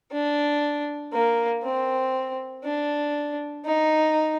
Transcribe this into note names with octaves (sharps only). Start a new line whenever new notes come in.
D4
A#3
C4
D4
D#4